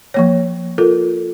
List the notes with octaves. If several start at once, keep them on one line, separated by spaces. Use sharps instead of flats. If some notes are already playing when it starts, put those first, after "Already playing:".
F3 A#3 C#5
F4 A4 A#4